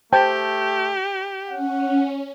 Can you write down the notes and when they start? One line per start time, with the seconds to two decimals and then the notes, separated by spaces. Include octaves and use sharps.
0.13 A3 G4 C5 G5 A5
1.48 C#4 F#5